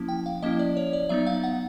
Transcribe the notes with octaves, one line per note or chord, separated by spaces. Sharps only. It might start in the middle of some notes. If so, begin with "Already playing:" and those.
Already playing: F3 A#3 C#4 E4
G5
F5
F3 A#3 C#4 E4 D#5
D5
C#5
D5
F#3 B3 D#4 E5
F5
F#5